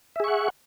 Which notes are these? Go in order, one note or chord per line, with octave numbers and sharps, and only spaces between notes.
G#4 E5 F#5 C#6